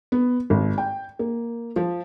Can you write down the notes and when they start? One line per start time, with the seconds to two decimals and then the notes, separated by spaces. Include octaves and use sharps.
0.12 B3
0.50 G#1
0.78 G5
1.19 A#3
1.76 F3